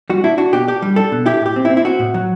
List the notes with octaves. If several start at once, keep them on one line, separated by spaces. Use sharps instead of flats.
G3 F#4
D4 E4
D4 F#4
B2 G4
D4 G4
G3
D4 A4
B2
E4 G4
A2 G4
C4
E4
C4
E4
C4 F#4
A2
F#3